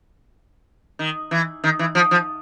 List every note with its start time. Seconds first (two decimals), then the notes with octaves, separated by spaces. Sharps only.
0.99 D#3
1.31 E3
1.64 D#3
1.79 E3
1.95 F3
2.11 F3